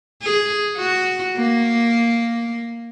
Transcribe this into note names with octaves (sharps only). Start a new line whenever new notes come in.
G#4
F#4
A#3